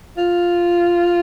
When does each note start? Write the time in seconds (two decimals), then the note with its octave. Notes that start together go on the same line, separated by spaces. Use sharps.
0.17 F4